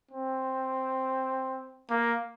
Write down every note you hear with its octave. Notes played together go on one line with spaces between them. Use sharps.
C4
A#3